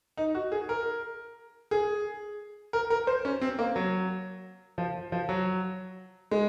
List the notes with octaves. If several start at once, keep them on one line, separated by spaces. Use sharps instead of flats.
D#4
F#4
G#4
A#4
G#4
A#4
A#4
C5
C#4
C4
A#3
F#3
F3
F3
F#3
G#3